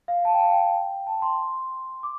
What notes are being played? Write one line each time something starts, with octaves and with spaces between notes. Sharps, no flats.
F5
A5
G5
F5
G5
A5
C6
D6